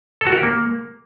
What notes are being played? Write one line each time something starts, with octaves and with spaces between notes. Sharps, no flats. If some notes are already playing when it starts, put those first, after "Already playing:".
A4
F#4
A#4
G4
A#3